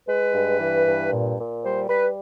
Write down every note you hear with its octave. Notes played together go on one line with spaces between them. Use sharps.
G#3 B4
G2
E3
G2
A#2
A#2
G3 C5
G3 B4